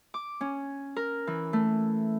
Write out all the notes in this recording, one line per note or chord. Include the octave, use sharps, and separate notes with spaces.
D6
C#4
A#4
E3
A3